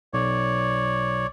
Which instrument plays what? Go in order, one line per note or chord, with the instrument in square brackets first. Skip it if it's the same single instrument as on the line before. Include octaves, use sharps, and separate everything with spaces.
[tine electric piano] B1 [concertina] C#5 D5